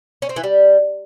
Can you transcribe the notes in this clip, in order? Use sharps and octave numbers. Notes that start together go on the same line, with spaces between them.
C#4
C4
E3
G3